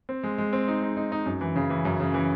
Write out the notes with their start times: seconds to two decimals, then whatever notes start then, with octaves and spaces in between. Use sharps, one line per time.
0.09 C4
0.23 G#3
0.38 G#3
0.53 C4
0.68 D#4
0.82 D#4
0.97 D#4
1.12 D#4
1.26 F#2
1.41 E3
1.56 C#3
1.70 E3
1.85 F#2
2.00 C#3
2.14 E3